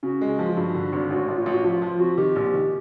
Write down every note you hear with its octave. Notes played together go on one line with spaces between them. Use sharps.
C#3 F#4
G#3
F3
F4
G2 F#4
D3
G#1
A1 F#4
A1
F4
A1
F#4
F3 F4
F3 F4
C4 F#4
D#3 G4
A#1
D#3